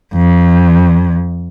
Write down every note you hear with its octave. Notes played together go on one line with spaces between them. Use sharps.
F2